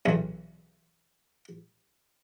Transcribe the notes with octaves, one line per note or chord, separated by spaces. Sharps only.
B1 E2